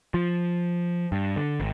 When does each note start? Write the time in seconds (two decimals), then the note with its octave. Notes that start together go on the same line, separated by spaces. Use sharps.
0.14 F3
1.12 G2
1.36 D3
1.60 G#1